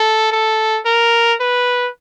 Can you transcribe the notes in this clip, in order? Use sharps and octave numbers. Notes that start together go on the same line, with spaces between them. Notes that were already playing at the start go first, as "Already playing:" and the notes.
Already playing: A4
A4
A#4
B4